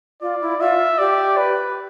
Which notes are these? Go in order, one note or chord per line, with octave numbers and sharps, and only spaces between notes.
F4 D5
E4
F4 E5
G4 D5
B4